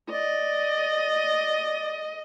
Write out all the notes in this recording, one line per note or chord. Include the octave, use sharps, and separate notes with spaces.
D5 D#5